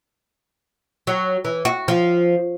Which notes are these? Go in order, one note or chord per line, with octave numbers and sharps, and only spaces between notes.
F#3
E3
F#4
F3